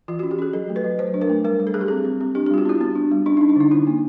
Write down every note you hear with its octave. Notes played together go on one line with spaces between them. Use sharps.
E3 F4
F#4
C#4
G4
C#4 G#4
F#3 A4
A3
B4
F#3
F#3 C5
D4
A#4
A3
G3 A#4
G3
A4
G3 G#4
G4
C4 G#4
C4
C4
D4 G4
G4
G3 F4
F#4
B3 E4
B3
D4
G3
C#4 D4
D#4
C#4
D4
D3 D#4
C#4 E4
A#3